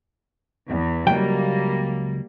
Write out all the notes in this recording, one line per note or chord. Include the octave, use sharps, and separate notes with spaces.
E2
C#2 F#3 G3 A#3 G5